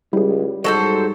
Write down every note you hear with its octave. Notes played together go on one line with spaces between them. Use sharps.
C#2 G3 E4 G#4
G#2 F#3 A4 C5 D#5